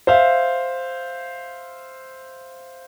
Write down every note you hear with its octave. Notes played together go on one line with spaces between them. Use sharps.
C5 E5 F5